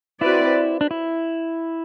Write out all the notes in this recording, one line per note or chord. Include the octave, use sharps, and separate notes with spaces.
C4 E4 F#4 B4 D5
D4
E4